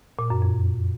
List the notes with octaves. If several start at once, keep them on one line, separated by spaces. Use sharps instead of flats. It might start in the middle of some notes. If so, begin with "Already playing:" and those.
A#2
F#2
F2